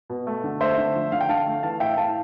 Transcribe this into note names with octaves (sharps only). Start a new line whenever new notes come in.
B2
A3
D3
A3 C5 E5
D3
F3
D3 F5
G5
D3 F5 A5
A3
E3 F5 A5
A2 E5 G5
A2 F5 A5